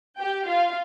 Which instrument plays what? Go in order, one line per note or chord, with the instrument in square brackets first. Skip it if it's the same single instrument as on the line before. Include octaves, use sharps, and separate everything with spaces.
[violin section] G4 G5
F4 F5